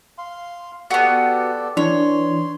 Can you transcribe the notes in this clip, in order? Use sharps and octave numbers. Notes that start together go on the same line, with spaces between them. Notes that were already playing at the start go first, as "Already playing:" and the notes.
F5 C6
B3 F#4 G4 A4 D5
E3 D4 C#5 C6